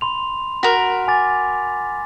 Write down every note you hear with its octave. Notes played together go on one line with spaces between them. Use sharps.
B5 C6 F7
F#4 A#4 B6
G#5 D6 A6